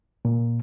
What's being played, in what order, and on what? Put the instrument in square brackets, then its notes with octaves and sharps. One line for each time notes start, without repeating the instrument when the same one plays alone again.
[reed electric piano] A#2